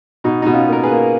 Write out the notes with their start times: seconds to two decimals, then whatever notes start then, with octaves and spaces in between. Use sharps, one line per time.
0.24 B2 D#4
0.42 B2 D#4
0.53 C#4 F4
0.68 A#3 A#4
0.83 G#4 B4
0.91 A#3